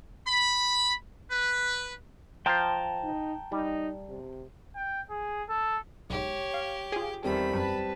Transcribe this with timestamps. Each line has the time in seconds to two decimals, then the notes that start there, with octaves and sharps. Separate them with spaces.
0.27 B5
1.30 B4
2.46 F3 C5 G5 A5 A#5
3.03 D#4
3.52 G3 D#4
4.09 C3
4.76 G5
5.10 G#4
5.49 A4
6.10 B1 G#2 G4 C#5
6.54 F5
6.92 F4 G#4
7.24 E2 D#3 G3 A3 C4 B5
7.55 F#2 B4 A5